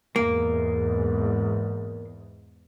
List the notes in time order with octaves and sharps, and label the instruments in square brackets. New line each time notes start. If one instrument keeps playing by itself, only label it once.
[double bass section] E2 G#2 [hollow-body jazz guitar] A#3